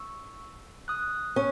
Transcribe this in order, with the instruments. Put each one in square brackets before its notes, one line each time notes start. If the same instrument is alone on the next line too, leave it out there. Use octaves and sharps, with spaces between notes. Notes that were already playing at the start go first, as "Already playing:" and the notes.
Already playing: [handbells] C#6 E6
D#6 F#6
[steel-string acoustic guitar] C#4